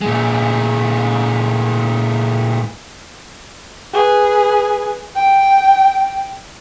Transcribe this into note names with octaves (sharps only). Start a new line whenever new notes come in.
A#2 G#3
G#4 B4
G5